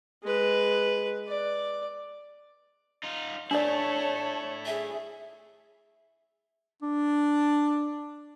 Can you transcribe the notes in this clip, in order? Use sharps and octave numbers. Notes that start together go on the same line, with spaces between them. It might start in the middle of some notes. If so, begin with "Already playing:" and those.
G#3 B4
D5
D#4 F4
A3 D4 E4 C#5 D5 A5
G#4 E5
D4